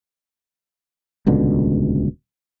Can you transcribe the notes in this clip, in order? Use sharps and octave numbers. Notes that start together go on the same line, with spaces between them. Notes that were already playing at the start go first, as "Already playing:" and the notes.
D#1 C#2 B2 D3